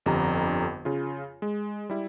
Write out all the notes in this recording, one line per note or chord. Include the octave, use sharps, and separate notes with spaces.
G1 F2 D3 G3 G4 A#5
C#3 F4
G#3
G3 E4